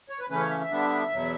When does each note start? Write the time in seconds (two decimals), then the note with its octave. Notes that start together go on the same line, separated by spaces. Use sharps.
0.09 C#5
0.20 B4
0.30 C#3 E3 A3 C#4 B4
0.40 C#5
0.50 E5
0.61 E5
0.70 D3 G3 B3 D4
1.12 E2 B2 F#3